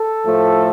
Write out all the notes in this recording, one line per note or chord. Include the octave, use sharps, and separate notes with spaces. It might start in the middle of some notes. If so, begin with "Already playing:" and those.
Already playing: A4
A2 F3 A3